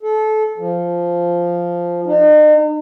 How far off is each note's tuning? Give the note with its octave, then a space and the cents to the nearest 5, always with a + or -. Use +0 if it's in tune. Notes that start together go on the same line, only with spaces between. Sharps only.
A4 -25
F3 -5
D#4 -40